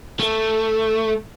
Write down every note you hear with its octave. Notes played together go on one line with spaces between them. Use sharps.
A3